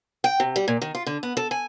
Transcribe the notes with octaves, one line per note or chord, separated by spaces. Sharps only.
G5
C3
G3
A#2
D#3
F4
D3
B3
A4
G#5